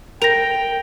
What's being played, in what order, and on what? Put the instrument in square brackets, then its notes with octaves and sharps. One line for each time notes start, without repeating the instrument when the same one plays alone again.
[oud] A#4 [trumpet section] G5 [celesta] A#6 F7